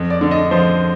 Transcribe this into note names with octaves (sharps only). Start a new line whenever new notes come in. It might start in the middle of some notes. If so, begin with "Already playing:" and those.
Already playing: F2
D5
D3
D#5
F3 C5